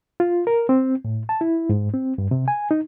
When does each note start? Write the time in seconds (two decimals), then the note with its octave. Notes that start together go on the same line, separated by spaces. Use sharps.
0.20 F4
0.47 A#4
0.69 C4
1.05 A2
1.29 A5
1.41 E4
1.69 G#2
1.94 C4
2.18 G2
2.31 C3
2.48 G#5
2.71 D#4